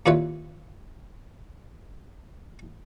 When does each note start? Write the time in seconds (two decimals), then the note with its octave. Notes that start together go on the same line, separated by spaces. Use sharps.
0.06 D#2 A#2 E4 F4 B4 C#5